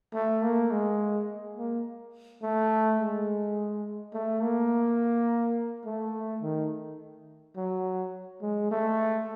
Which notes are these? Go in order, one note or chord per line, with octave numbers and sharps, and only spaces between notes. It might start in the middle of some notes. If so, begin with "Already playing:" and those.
A3
A#3
G#3
A#3
A3
G#3
A3
A#3
A3
D#3
F#3
G#3
A3